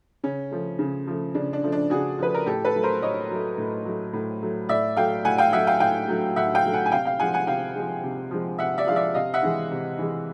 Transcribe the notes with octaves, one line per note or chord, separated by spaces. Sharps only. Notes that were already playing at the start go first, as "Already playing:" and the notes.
C#3 C#4
F3 A3
C#3
F3 A3
C#3 D4
D4
F3 A3
D4
C#3 F#4 G#4
F3 A3 B4
A#4
A2 G4 A4
A4 B4
F#3 A3
A#4 C5
A2 C#5 D#5
F#3 A3
A2
F#3 A3
A2
F#3 A3
A2 D5 E5
F#3 A3 F5 G5
A2 F#5 G#5
F5 G5
F#3 A3 E5 F#5
F5 G5
A2 F5 G5
F#3 A3
A2 E5 F#5
F5 G5
F#3 A3
F#5 G#5
G#5
C3 F5 G5
F5 G5
F3 G#3 F#5 G#5
F#5 G#5
C3 F5 G5
F3 G#3
C3
F3 G#3
C3 E5 F#5
D5 E5
F3 G#3 F5
D5 E5
C3 D#5 F5
E5 F#5
E3 G#3
C3
E3 G#3